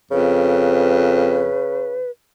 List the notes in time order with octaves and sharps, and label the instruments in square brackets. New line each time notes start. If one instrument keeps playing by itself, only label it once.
[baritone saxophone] F2 [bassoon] C#3 [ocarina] B4